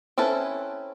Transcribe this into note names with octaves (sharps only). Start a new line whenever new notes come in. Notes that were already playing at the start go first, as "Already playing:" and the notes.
C4 C#4 E4 A4 B4